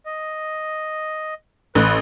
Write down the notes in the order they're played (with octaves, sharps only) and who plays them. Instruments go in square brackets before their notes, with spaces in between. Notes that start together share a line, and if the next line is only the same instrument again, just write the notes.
[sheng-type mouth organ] D#5
[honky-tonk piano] A1 [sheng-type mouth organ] B4